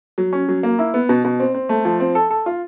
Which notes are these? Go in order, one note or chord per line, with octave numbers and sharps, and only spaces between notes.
F#3
C#4
F#3
A#3
E4
B3
B2
B2
C4
C4
A3
F3
C4
A4
A4
F4